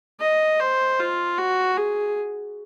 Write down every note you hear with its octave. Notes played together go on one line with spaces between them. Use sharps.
D#5
C5
F4
F#4
G#4